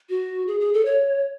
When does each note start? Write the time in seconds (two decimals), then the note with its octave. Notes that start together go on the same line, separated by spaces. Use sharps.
0.09 F#4
0.48 G#4
0.60 G#4
0.74 A4
0.85 C#5